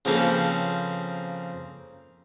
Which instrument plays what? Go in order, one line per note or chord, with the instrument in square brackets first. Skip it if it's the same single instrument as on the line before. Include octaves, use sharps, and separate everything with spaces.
[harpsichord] C#3 F3 A#3 C4 A4 B4